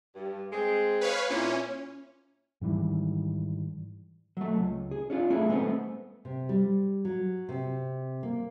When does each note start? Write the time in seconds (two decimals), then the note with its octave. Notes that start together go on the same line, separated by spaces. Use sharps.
0.15 G2
0.52 G#3 C4 G#4
1.01 B4 C#5 F5
1.30 A#2 C#4 E4
2.61 G#2 D#3 E3 G3
4.37 F#3 A3
4.56 C#2
4.91 G#4
5.10 C#4 D4 F4
5.30 A3 C#4 D4 E4 G#4
5.49 G#3 A3 B3 C4
6.25 C3
6.49 G3
7.05 F#3
7.49 C3
8.23 A#3